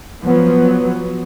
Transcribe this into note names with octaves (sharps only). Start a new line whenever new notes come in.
F3 F#3 B3